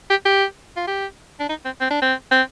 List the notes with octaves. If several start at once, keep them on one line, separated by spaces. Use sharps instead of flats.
G4
G4
F4
G4
D4
D#4
C4
C4
D4
C4
C4